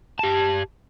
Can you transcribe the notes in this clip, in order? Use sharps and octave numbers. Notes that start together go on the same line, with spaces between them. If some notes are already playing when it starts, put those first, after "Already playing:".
G4 A5